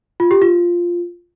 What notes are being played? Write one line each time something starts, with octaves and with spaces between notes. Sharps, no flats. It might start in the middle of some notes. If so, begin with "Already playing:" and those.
F4
G4
F4